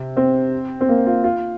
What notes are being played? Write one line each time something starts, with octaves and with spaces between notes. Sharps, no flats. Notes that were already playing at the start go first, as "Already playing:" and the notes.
Already playing: C3
C4
C4
A#3
F4
F4